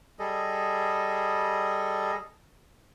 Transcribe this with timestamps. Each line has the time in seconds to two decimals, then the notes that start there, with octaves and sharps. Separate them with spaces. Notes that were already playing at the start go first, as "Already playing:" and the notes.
0.19 G3 G#4 A4 D#5